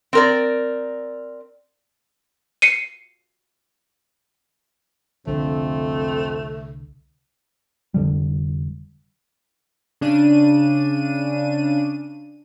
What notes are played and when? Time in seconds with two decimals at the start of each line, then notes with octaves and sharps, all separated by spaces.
0.13 C4 A#4 D5
2.62 C7 C#7 D#7
5.27 C2 F2 D3 A3 C4 A4
7.94 F1 D3 G3
10.01 C#3 D4 D#7